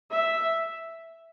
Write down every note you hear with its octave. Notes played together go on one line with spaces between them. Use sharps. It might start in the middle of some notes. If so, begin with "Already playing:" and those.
E5